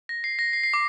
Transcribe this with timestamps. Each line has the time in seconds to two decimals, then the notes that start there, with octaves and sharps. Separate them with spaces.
0.09 A#6
0.24 C7
0.39 A#6
0.53 C7
0.63 C7
0.74 D6